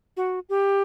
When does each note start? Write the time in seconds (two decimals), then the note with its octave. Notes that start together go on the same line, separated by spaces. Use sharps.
0.17 F#4
0.49 G4